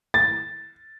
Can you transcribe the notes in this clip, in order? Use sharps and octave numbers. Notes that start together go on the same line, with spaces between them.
A6